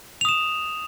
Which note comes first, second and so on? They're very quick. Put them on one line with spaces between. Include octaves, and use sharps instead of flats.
F7 D#6 E7